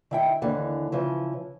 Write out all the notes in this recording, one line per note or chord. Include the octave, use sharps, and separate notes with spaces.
D#3 E4 G5
D#2 D3 E3
C#3 E3 F3